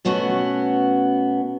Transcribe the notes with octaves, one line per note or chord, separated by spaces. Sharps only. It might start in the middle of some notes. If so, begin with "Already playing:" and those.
B2 A3 B3 C#4 F#4